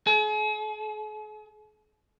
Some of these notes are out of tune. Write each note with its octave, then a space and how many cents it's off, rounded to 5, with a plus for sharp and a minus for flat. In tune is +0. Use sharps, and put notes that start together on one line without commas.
G#4 +45